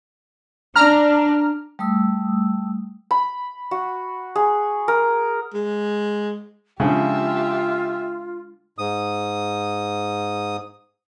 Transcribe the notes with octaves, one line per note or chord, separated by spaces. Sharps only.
D4 A#5 F6
G3 A3 D#6 E6
B5
F#4
G#4
A#4
G#3
C#3 F3 G#3 D4 F4 G4 E5
G#2 D#6